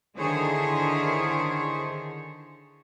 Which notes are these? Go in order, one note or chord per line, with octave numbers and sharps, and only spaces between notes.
D3 D#3 E4 G#4 C5 C#5